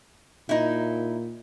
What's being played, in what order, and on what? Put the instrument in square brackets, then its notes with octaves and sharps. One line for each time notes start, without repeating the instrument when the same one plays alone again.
[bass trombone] A#2 [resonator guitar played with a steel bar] D#4 E4